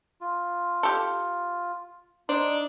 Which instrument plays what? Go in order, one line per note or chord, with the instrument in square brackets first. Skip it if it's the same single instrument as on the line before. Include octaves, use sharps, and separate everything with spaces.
[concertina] F4
[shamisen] G4 A4
[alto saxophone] D4 [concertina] D#4 [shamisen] C5